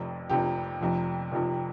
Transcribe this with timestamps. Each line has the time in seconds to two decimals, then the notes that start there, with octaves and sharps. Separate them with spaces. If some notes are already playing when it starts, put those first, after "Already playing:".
Already playing: F1 F2 C3 F3
0.29 F1 F2 C3 F3 G4
0.81 F1 F2 C3 F3
1.32 F1 F2 C3 F3